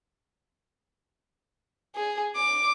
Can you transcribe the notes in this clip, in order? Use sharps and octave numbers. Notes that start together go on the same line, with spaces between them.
G#4
D6